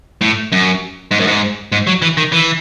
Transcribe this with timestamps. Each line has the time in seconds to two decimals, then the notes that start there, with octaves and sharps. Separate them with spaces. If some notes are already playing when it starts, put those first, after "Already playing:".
0.21 A2
0.52 F#2
1.11 G#2
1.20 F#2
1.27 G#2
1.72 G#2
1.87 F#3
2.02 E3
2.17 D#3
2.32 E3